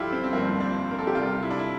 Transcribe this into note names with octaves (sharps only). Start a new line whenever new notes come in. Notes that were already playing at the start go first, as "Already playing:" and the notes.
Already playing: G1 G2 F3 E4 F4 G4 A4
C4
C4
G1 G2 F3 A#3
D4
A#4
A4
G4
C2 C3 G3 F4
E4
D4
E4